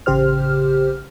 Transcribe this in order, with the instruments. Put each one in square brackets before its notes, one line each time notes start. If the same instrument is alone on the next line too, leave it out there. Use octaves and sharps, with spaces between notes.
[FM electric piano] A1 C#3 G4 C5 F6